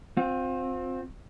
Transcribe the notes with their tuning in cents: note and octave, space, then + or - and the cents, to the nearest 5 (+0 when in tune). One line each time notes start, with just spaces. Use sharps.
C4 +0 F4 +35